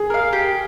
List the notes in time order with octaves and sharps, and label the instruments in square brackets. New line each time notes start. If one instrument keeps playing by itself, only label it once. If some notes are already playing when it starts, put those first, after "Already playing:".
Already playing: [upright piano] G#4
[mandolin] A#4 F5
G4